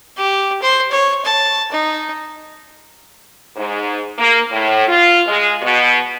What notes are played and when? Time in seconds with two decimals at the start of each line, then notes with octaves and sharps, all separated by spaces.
0.17 G4
0.62 C5
0.91 C#5
1.25 A5
1.72 D#4
3.56 G#2
4.18 A#3
4.50 A2
4.87 F4
5.27 G#3
5.62 B2